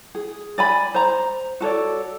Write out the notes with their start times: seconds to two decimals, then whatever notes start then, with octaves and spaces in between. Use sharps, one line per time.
0.15 G#4
0.58 D5 G#5 B5
0.94 C5 A#5
1.61 F#4 A4 C#5 D5